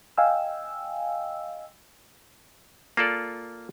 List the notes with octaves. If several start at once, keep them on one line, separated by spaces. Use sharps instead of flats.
D#5 F5 G5 G#5 E6
A#3 F4 A4 D5